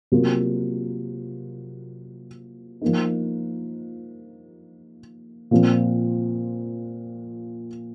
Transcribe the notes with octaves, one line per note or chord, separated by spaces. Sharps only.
C3 F#3 A#3 F4
F3 A#3 D#4
A#2 F3 C4